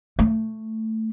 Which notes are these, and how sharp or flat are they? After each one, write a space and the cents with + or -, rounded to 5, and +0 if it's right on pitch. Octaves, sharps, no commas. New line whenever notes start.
A3 +10